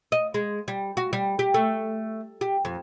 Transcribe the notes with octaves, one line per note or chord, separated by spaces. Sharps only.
D#5
G#3
G3
F#4
G3
G4
A3
G4
F2